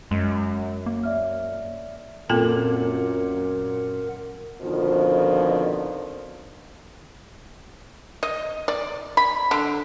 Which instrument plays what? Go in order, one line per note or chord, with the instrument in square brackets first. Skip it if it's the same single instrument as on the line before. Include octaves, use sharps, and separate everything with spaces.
[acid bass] F#2 [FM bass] G#3
[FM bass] A#3
[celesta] D5 E5 F6
[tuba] F#2 [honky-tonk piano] A#2 [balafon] C4 A4 A5 [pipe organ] A#4 F#5
[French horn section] F2 B2 D3 D#3 F3
[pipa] D#5
D5
B5
D3